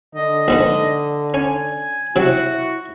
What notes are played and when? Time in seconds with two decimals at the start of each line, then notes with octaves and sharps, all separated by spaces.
0.15 D3 D#5
0.48 A#1 G#2 B4
1.34 C#4 G#5
2.16 C3 F#3 E4 F#4